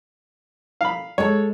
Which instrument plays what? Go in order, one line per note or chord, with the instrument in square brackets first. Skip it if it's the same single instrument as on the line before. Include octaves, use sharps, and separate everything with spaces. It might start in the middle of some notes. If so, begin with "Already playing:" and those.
[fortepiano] F5 B5
[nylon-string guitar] G#3 A4 [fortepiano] C#5